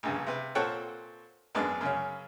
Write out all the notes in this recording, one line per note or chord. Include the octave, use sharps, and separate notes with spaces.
A#1 G2 C#3
C3 B4
A#2 C4 A4 C#5 F#5 G5
G#1 F#2 G#3 B3 D4
F#2 C#3 C#4